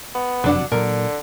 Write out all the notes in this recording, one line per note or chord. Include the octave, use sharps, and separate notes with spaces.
B3
F#1 F2 C3 F#3 D4 F#5
A#2 D3 F#3 A#4